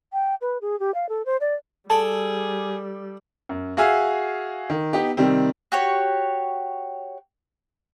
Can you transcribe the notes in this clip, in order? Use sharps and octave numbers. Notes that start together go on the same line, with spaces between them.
G5
B4
G#4
G4
F5
A4
C5
D5
G3 G#4 A4 D5 A5
F#2
F#4 G#4 E5 F5 G#5 E6
D#3
B3 D#4 G4
C3 D#3 G3 C4
F#4 G4 C#5